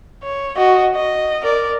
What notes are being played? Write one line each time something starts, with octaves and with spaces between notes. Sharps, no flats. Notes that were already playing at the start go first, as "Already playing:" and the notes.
C#5
F#4 D#5
D#5
A#4 D5